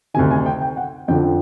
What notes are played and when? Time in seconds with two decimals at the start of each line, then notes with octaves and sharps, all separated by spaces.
0.14 D2 C3 D#3 G#5
0.31 G#5
0.46 G5
0.62 G5
0.77 F#5
1.08 F2 D3 F3 G5